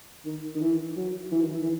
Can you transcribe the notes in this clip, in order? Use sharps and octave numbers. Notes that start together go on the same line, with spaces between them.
D#3
D#3
E3
F#3
E3
D#3
E3
E3